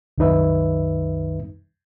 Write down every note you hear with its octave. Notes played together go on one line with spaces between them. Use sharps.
C2 F#2 D#3 D#4 B4 E5